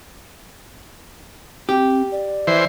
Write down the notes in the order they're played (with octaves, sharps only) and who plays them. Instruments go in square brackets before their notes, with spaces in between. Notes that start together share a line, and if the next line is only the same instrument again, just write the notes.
[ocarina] C4 [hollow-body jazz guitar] G4
[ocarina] D5
[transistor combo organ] E3 C5